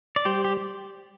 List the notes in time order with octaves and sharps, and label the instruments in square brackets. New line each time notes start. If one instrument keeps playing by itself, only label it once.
[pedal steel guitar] D5
[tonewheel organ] G3 [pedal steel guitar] G4 C5
[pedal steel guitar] G4